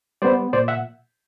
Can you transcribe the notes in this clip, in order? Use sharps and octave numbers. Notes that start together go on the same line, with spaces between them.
G3 B3 C5 D5
A#2 C5 D5
E5 F#5